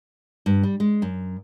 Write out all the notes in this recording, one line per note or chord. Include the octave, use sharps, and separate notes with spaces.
G2
G3
G#3
F#2